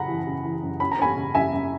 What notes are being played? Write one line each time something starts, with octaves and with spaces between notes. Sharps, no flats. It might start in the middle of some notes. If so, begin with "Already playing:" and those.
Already playing: F#2 C#3 F#5 A#5 B5
E3
C#3
E3
F#2
C#4 B5
A#5
C#4 G#5 B5
C#3
F#2 E5 G#5
F#2